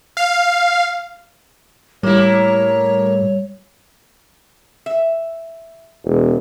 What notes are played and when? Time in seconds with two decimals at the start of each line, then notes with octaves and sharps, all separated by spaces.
0.17 F5
2.03 A2 G3 A#3 E4 C#5
4.86 E5
6.05 E1